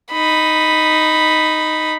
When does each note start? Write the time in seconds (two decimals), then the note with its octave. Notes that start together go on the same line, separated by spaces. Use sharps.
0.12 D#4 B5